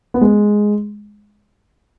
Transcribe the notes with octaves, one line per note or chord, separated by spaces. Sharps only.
B3
G#3